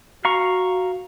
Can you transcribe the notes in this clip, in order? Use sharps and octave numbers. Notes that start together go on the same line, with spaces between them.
F#4 F5 A#5 C#6